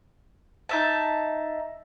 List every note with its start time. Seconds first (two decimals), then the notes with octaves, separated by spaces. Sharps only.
0.69 D#4 E5 A5